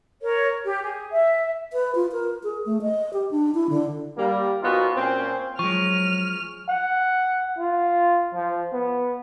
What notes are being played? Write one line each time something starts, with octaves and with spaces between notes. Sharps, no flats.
A#4 C#5
G4
G#4
E5
B4
F4
A#4
G#4
A3
D#5
G4
D4
E4
D3
G3 A#3
A#2 F3 B3 D#4 F4 F#4
A#2 C4 C#4
F3 F#3 G#3 C#6 F6
F#5
F4
F3
B3